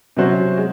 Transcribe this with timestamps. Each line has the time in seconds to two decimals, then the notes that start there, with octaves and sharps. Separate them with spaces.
0.17 C3 F#3 C#4 F#4 C5
0.57 G#3